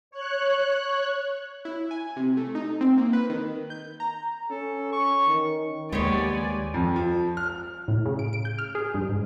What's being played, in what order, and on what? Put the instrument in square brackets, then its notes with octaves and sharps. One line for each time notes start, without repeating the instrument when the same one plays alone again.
[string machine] C#5 F#6
[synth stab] E4
G#5
C3
A3
D#4
C4
A#3
B4
D#3
G6
A#5
[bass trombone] C#4 [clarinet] A4
[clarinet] C#6
[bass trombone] D#3
[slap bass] D#2 [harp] G#3 [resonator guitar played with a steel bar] B3 G4 C#5 [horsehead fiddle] D5 G#5
[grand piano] F2
F3
F6
[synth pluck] A2
C#3
D7
D7
G6
F6
G#4
G2
G#2